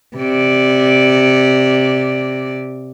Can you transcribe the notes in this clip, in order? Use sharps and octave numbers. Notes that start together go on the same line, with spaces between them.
C3 D5